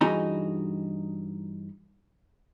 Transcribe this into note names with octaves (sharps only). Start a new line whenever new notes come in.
G2 E3 D#4 F#4 G#4 B5